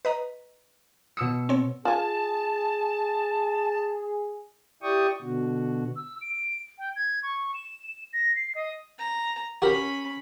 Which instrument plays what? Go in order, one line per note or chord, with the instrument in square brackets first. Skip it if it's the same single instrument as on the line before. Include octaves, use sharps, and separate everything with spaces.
[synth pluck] B4 D#5 A#5
[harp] B2 E6 C#7 [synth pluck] D#6
[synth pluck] C4 C#5
[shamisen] F4 G#5 [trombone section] G#4 [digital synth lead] A5
[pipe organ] E4 G4 D5 G5 C#6 D#6
B2 D3 F#4
[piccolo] E6
D7
G5
G#6
C#6
E7
A#6
C7
D#5
[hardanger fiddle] A#5
[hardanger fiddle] C#4 B5 [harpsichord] F#4 G4 A#4